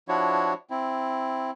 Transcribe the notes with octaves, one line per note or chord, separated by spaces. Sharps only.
F3 D4 E4 F#4 C#5
C4 E4